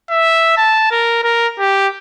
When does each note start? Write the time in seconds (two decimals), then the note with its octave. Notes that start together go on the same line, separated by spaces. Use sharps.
0.10 E5
0.58 A5
0.91 A#4
1.24 A#4
1.59 G4